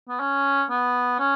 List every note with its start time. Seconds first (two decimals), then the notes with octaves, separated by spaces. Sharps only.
0.08 B3
0.20 C#4
0.70 B3
1.19 C#4